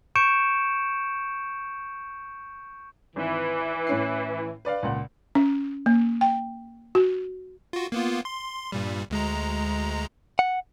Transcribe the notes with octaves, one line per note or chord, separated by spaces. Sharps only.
C#6 G6 C#7 D7 E7
G#1 E3
A2 C#4 C7
B4 D5 F5
C#2 A#2 F#5
C#4
A#3
G5
F#4
F4 F#4
A#3 B3 F4
C6
G2 A#2 G3
D2 G#3 A#5
F#5